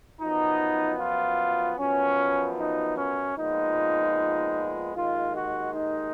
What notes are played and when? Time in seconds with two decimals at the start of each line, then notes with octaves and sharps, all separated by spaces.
0.20 F#2 F3 B3 D#4
0.99 F4
1.78 F#2 F3 B3 C#4
2.57 D#4
2.97 C#4
3.36 A#2 F3 G#3 B3 D#4
4.94 D#2 D#3 G#3 F4
5.34 F#4
5.73 D#4